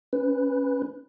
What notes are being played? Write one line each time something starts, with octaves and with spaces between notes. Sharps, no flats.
C#4 B4